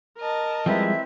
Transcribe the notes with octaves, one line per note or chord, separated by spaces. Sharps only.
A#4 D#5 A5
F3 G3 G#3 C4 E4 B4 E5